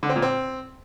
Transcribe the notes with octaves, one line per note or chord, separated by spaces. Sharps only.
D3
C4
A#2
C4